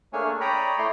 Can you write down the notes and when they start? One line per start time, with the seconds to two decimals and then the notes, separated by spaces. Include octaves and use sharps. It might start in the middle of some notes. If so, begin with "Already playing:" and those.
0.13 A3 A#3 D4 G#4 C#5 G#5
0.41 C#5 D5 G5 A#5 B5 D#6
0.78 A3 E4 D5 C6